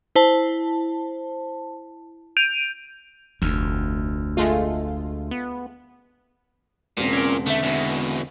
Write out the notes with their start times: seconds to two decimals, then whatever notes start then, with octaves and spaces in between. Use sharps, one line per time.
0.16 E4 C5 A5
2.37 G6 D7 D#7 F7
3.42 F1 D2
4.37 G#3 A3 F4
5.31 B3
6.97 E1 A#2 C#3 C4
7.13 C#4 A#4
7.46 D3 A3 E5
7.63 E2 B2